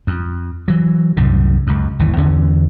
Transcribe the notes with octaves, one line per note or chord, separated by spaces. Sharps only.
F2
E3 F#3
C2 F#2 A2 C#3
C#2 F#2
G1 D#2 E3
E2 D3 E3 C#4